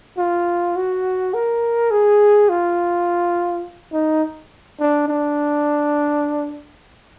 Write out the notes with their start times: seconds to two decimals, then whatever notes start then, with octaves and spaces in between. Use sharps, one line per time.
0.18 F4
0.76 F#4
1.34 A#4
1.91 G#4
2.49 F4
3.93 D#4
4.80 D4
5.08 D4